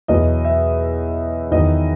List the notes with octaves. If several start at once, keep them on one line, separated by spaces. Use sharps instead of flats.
E2 B2 F#3 D#5
E5
E2 D#3 F#3 D#5